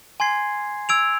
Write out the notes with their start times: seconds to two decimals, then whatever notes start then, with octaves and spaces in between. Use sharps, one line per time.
0.20 G#5 C6 G#6 C7
0.89 E6 G#6 D7 F7